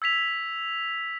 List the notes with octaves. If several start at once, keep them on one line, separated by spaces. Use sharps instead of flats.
E6 G#6 B6 F7